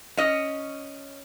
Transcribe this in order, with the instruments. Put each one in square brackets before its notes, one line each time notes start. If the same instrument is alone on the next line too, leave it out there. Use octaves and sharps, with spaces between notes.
[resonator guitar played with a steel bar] C#4 D#5